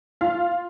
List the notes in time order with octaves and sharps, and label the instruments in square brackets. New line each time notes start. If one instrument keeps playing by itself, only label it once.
[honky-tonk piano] F4 F5